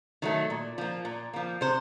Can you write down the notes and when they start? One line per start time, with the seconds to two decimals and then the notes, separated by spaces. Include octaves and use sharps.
0.22 D#3 F#3 A3
0.50 A#2
0.78 F3 A#3
1.05 A#2
1.33 F3 A#3
1.61 C3 C5